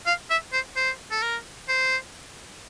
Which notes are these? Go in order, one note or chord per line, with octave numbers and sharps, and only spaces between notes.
F5
E5
C5
C5
A4
A#4
C5